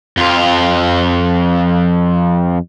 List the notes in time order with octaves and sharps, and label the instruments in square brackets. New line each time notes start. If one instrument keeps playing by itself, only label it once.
[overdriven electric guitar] F2 F4